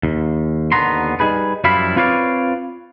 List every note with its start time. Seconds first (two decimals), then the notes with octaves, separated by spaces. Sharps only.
0.03 D#2
0.72 D#2 D3 B3 A#5 C6
1.20 G3 D#4 G#4 B4
1.64 F#2 F3 G3 E4 F5 B5
1.96 C4 F4 B4 C#5 D5 F5